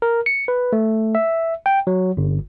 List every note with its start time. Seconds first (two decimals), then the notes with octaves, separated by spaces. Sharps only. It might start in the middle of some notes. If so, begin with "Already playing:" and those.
0.02 A#4
0.26 C#7
0.48 B4
0.73 A3
1.15 E5
1.66 G5
1.87 F#3
2.17 G1